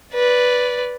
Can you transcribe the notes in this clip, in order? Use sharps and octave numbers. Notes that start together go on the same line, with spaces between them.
B4 D5